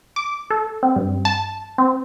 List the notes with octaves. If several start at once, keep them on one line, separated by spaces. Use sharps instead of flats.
D6
A4
C4
G2
A5
C4